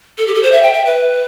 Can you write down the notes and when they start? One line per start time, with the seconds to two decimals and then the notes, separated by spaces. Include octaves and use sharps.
0.18 A4
0.27 G4
0.35 A4
0.43 C5
0.52 E5
0.63 G5
0.73 E5
0.85 B4